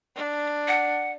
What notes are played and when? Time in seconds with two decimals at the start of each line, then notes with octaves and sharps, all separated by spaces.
0.16 D4
0.68 F#5